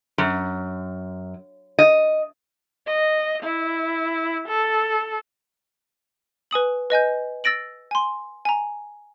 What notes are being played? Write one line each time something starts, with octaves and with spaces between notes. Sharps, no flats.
F#2
D#5
D#5
E4
A4
B4 G#5 D#6 F#7
B4 D#5 G#5 G6
E6 A6 A#6 D7 F#7
G#5 C6
G#5 A#5